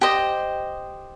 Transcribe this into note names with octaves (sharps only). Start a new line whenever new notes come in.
G4 C5 D#5